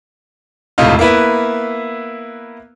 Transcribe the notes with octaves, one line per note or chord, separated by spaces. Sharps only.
E1 C#2 A2 C3 D#4 F4
A#3 B3 E4 B4